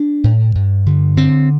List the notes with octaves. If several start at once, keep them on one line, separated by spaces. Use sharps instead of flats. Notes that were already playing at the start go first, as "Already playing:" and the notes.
Already playing: D4
A2
G2
D3
D3 C4